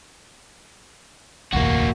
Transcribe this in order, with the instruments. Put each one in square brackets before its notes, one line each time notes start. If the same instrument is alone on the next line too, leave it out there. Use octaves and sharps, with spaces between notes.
[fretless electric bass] F1 A#1 D#2 [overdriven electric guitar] A#3 F#4